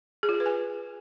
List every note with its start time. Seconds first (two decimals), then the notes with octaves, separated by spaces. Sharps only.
0.23 G#4
0.29 F4
0.34 G#4
0.40 B4
0.46 G#5